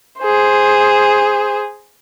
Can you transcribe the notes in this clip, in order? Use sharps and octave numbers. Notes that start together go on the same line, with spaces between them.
G#4 C5